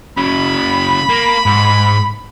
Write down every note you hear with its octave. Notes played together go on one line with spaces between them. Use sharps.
C#3 F#3 B5
A#3
G#2